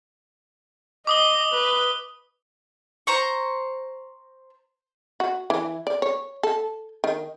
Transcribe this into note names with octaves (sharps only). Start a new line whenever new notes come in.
D#5 D6 D#6 G7
B4
C5 A#5 C#6
F#4
E3
D5
C#5
A4
D#3